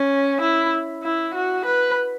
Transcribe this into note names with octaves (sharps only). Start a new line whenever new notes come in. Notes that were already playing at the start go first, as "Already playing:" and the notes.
Already playing: C#4
E4
E4
F#4
B4